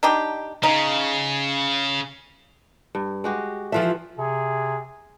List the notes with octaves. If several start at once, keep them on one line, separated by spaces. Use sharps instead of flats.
D4 D#4 G4
C#3 D#4
G2
G#3 F#4 G4
E3 F3 F4 A4 E5
C3 G#4